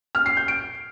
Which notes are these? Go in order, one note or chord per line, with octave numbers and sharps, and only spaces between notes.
F6
C7
G6
D7